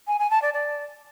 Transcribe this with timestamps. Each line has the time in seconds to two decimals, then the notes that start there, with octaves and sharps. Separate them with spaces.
0.07 G#5
0.19 G#5
0.30 A5
0.42 D5
0.53 D5